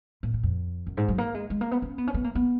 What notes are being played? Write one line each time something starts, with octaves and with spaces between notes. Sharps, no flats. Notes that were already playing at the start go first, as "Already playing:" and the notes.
A#2
A#2
F2
F#2
G#2
F#3
A#3
G#3
G#3
A#3
B3
C#4
B3
C#4
B3
A#3
B3